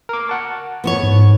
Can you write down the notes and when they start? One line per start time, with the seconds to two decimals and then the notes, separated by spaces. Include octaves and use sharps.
0.09 A#4 D6
0.27 F#5 A5 C#6
0.84 B3 C5 C#5
1.03 G#2